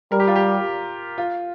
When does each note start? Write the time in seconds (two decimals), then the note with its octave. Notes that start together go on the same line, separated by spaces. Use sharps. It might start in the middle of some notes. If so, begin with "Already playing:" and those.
0.12 G3 A#4
0.20 G4
0.27 F4
0.36 G4
1.18 F4